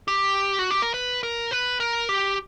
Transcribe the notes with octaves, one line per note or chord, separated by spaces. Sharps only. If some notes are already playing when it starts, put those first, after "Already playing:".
G4
F#4
G4
A#4
B4
A#4
B4
A#4
G4